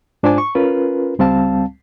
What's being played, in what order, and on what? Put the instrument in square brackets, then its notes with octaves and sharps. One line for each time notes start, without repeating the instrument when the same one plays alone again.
[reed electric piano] G#2 D4 F4 C5 G#5 D6
C#6
C#4 F4 A#4 B4
C#2 G3 C4 F5 A5